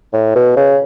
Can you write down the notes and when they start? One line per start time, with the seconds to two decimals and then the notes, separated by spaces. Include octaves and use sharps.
0.13 A2
0.35 B2
0.56 C#3